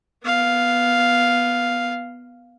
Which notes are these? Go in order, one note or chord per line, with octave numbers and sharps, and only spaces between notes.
B3 F5